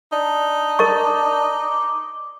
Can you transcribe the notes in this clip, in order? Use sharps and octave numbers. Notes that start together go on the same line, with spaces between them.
D4 D#4
A#4 D#5 C#6 D6